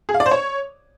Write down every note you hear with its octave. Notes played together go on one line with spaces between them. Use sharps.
G#4
F5
D5
C5
C#5